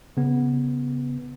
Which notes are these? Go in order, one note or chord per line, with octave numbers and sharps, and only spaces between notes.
C#3 B3